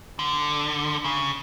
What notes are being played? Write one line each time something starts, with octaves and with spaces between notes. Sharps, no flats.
D3
C#3